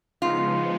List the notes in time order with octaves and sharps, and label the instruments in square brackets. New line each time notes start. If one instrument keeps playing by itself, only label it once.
[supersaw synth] C#3 F3 G#3 B3 D#4 [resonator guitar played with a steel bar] F4